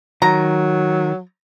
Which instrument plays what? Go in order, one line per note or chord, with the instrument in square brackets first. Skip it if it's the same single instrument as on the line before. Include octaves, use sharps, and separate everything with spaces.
[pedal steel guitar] D#3 [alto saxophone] F#3 [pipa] A#5